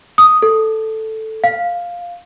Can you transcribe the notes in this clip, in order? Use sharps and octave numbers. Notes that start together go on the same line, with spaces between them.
D#6
A4
F5